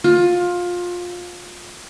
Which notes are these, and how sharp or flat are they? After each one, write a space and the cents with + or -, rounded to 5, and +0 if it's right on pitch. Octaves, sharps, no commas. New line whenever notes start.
F4 +20